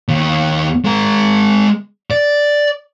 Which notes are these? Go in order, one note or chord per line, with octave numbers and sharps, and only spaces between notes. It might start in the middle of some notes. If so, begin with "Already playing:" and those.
D#2
G#3 A#4
D5